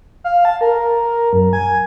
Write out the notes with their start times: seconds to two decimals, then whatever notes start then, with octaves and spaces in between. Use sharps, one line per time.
0.24 F5
0.45 A5
0.61 A#4
1.33 F#2
1.53 G#5